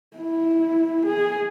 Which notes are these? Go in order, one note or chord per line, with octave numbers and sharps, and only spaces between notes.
E4
G#4